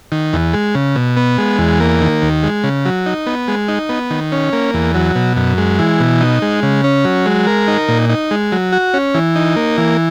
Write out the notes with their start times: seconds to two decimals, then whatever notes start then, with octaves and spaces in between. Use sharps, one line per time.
0.12 D#3
0.33 E2
0.54 G#3
0.75 C#3
0.96 B2
1.17 B3
1.38 G#3
1.59 E2
1.80 A#3
2.01 D#3
2.22 D#2
2.43 G#3
2.64 C#3
2.85 F#3
3.06 D#4
3.27 B3
3.48 G#3
3.68 D#4
3.89 B3
4.11 D#3
4.32 C#4
4.53 A#3
4.74 E2
4.95 F#3
5.15 B2
5.37 F#2
5.58 G#3
5.79 E3
6.00 B2
6.21 D#4
6.42 G#3
6.63 C#3
6.84 C#4
7.05 F#3
7.26 G#3
7.47 A#4
7.68 D#4
7.89 A#2
8.10 D#4
8.31 G#3
8.52 F#3
8.72 F#4
8.94 C#4
9.14 E3
9.36 D#4
9.56 A#3
9.78 E3